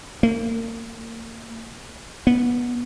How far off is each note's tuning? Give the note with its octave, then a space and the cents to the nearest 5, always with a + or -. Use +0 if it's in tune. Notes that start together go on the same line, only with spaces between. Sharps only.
A#3 -35
B3 -15